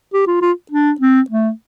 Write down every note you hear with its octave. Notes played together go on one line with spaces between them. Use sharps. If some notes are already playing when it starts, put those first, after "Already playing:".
G4
F4
F4
D4
C4
A3